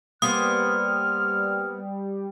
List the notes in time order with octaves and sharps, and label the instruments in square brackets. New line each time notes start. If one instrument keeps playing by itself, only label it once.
[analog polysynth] G3 [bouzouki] A#3 B3 C5 [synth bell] D#6 [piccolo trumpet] F6